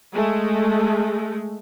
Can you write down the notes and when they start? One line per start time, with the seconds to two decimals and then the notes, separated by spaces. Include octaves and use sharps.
0.13 G#3 A3